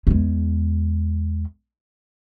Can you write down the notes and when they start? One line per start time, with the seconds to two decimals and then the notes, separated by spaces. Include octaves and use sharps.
0.07 E2 G#3